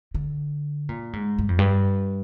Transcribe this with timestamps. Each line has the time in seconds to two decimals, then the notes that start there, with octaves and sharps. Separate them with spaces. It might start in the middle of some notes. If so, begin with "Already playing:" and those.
0.14 D3
0.89 A#2
1.13 G#2
1.38 G2
1.49 F2
1.59 G2